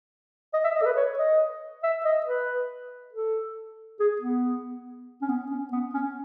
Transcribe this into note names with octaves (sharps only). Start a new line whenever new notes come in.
D#5
E5
D#5
A4
B4
C#5
D#5
E5
D#5
B4
A4
G#4
B3
C#4
B3
C#4
B3
C#4